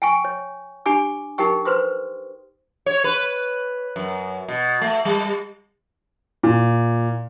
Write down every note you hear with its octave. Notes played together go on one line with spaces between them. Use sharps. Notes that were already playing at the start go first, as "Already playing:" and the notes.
G5 G#5 C#6
C#5
D4 G4 G#5 D6
D#4 G4 A#4 G5 C#6
B4 C5 C6 D#6
C#5
B4
F#2
B2
A3
G3
A#2